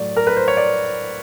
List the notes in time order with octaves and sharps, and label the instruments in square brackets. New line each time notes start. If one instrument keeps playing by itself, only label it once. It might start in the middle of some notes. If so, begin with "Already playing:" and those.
Already playing: [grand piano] A2 F#3 A3 D5
A#4
B4
C5
C#5
D5